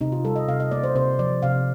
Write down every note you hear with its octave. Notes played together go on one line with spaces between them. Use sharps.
C3 D#4
F4
G3 A4
D#5
C3 F5
D#5
A#3 D5
C5
C3 C5
F3 D5
C3 F5